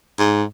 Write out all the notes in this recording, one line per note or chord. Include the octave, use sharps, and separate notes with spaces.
G#2